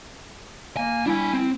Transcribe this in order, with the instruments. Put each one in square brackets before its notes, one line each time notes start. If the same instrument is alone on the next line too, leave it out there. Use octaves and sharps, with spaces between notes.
[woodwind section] A#3 [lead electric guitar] G#5
[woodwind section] G3 E4 [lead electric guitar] D4 G#5
[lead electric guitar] C4